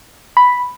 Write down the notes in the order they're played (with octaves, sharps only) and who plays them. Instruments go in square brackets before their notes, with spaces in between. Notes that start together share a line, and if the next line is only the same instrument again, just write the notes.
[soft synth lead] B5